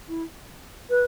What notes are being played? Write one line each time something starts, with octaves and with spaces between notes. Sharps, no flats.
E4
B4